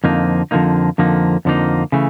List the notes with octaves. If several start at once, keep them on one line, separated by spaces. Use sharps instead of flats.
F2 D3 F3 A#3 D#4
F2 D3 F3 A#3 D#4
F2 D3 F3 A#3 D#4
F2 D3 F3 A#3 D#4
C#3 E3 A3